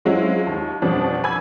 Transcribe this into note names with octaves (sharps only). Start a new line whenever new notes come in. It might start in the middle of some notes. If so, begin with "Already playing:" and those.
F#3 G#3 C4 C#4 E4 F4
D#2
F2 B2 F3 G3 C#4 D4
G#5 B5 D6 E6 G#6